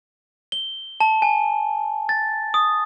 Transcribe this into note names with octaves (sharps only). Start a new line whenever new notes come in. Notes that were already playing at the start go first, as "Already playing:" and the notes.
G7
A5
G#5
A6
D#6